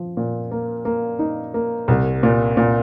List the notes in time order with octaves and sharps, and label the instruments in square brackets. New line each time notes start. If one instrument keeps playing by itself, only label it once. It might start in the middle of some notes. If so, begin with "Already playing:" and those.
Already playing: [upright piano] F3
A#2
A#3
A#3
D#4
A#3
C2
A#2
A#2